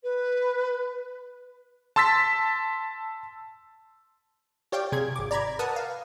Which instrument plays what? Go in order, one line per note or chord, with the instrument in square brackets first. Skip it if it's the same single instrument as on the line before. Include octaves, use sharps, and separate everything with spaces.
[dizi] B4
[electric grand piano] A5 C6 E6 A6 B6
[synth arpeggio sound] G4 C#5 D5 F5 G5
C3 G#4 G#6
G#1 D6
D5 A#5 B5 G#6
A#4 B4 F#5 A5 D#6
F5